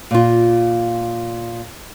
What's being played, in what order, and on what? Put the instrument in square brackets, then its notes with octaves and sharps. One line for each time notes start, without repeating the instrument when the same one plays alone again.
[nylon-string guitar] A#2 F4